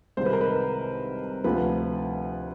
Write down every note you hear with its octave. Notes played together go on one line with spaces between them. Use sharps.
C2 C3 D#3 G#3 C5
B4
A#4
B4
D2 C3 F3 B4